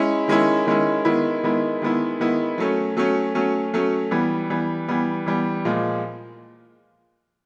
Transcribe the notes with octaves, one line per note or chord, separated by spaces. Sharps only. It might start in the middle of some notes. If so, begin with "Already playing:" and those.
Already playing: G#3 C#4 E4
D#3 G#3 C#4 E4
D#3 G#3 C#4 E4
D#3 G#3 B3 E4
D#3 G#3 B3 E4
D#3 G#3 B3 E4
D#3 G#3 B3 E4
F#3 A3 C#4
F#3 A3 C#4
F#3 A3 C#4
F#3 A3 C#4
E3 G3 B3
E3 G3 B3
E3 G3 B3
E3 G3 B3
A#2 F3 G#3